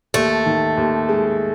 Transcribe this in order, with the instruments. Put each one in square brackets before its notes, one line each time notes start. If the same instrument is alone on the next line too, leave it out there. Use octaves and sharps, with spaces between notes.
[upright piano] D#2 [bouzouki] A3
[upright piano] D#3
D#2
G#3